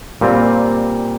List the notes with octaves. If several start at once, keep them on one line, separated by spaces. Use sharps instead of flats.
A#2 G3 C4 F4